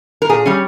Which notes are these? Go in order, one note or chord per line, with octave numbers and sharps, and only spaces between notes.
A#4
A#2 G#4
G3 C#4